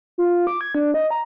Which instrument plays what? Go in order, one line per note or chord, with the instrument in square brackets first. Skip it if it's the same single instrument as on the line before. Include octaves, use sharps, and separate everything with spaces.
[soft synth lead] F4
D6
G#6
D4
D#5
A#5